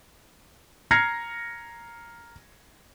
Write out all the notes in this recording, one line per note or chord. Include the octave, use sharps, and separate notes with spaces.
A#5 F6 G#6 A#6 C7 C#7